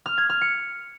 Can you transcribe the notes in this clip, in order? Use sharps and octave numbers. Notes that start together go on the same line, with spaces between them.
F6
G#6
F6
C#7